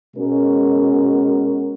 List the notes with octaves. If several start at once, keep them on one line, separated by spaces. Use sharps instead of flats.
B2 G#3 C#4 F#4 A#4